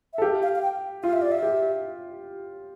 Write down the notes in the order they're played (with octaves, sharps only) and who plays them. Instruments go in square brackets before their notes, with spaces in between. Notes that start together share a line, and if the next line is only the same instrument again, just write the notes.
[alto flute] E5
[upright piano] A4
[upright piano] G4 [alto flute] F5
[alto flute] F5
F5
G5
[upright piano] F4 [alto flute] F5
[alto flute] E5
D5
E5
[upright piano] G4